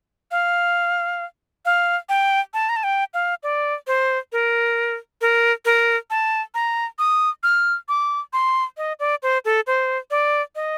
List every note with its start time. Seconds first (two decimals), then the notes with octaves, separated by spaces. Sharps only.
0.31 F5
1.65 F5
2.09 G5
2.54 A5
2.69 A#5
2.76 A5
2.84 G5
3.14 F5
3.43 D5
3.87 C5
4.32 A#4
5.21 A#4
5.65 A#4
6.10 A5
6.54 A#5
6.99 D#6
7.43 F6
7.89 D6
8.33 C6
8.77 D#5
9.00 D5
9.23 C5
9.45 A4
9.67 C5
10.11 D5
10.55 D#5